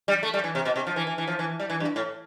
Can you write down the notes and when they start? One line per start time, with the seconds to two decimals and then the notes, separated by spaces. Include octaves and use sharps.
0.08 G3
0.23 A3
0.34 G3
0.44 E3
0.55 C3
0.65 B2
0.76 C3
0.87 F3
0.96 E3
1.07 E3
1.18 E3
1.28 F3
1.39 E3
1.60 G3
1.70 E3
1.80 G2
1.96 A2